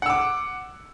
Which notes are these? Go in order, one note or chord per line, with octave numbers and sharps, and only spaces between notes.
F#5 D6 E6